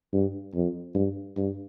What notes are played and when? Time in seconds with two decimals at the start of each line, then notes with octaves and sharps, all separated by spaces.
0.13 G2
0.54 F2
0.95 G2
1.37 G2